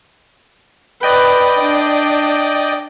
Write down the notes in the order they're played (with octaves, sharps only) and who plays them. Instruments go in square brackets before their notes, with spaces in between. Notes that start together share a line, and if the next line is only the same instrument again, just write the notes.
[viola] B4 [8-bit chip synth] D5 D#5 G5
[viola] D4